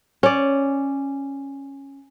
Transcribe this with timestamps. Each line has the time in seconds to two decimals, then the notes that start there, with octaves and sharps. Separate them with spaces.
0.23 C#4 D5